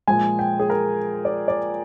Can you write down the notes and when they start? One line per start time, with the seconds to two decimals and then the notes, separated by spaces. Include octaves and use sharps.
0.08 A#2 F3 G#3 G#5
0.39 G5
0.60 G#4
0.70 A#4
1.25 D5
1.48 D5